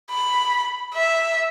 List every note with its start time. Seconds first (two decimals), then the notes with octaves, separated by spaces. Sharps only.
0.10 B5
0.94 E5